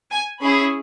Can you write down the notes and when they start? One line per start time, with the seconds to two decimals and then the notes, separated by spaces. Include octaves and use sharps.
0.11 G#5
0.40 C#4 E4 G#4 B5